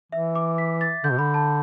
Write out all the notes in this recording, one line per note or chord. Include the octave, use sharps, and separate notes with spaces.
E3 E5
D6
B6
A6
D3 G6
B2
D3 B5
A5